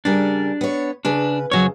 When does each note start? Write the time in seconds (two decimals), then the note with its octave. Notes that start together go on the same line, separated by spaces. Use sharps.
0.05 C#3 G3 D4 A#4
0.61 B3 C#5
1.05 C#3 D4 B4
1.51 F2 C#3 F#3 F#4 C#5